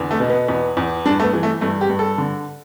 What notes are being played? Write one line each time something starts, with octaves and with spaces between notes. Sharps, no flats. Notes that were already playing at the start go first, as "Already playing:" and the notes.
Already playing: E2 D3
A3
B2
B3
E2 B3
E2
G2 D4
A3
B3
E3
A3
G2 A3
G4
G2
A4
D3